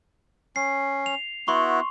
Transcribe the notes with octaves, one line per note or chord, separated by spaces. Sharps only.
C#4 C7
F7
B3 E4 F#4 C6 C#6